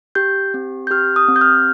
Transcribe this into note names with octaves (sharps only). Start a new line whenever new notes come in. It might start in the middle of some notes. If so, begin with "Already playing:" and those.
G4 G6
C4
G6
G4 F6
D#6
C4
G6
F6